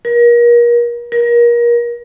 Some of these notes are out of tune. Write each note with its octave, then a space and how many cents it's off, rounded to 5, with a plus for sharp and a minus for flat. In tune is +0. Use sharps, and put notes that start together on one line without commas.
A#4 +35
A#4 +30